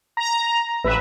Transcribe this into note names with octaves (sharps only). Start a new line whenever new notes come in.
A#5
A1 B4 E5